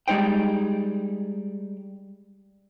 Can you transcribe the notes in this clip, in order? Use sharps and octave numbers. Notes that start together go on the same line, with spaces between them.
G3 G#3 D#4 C5 G5